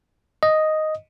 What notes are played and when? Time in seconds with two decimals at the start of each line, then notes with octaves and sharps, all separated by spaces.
0.43 D#5